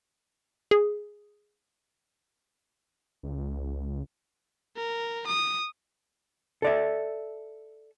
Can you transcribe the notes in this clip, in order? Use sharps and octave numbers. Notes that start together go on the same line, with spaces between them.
G#4
C#2
A#4
D#6
A4 D5 E5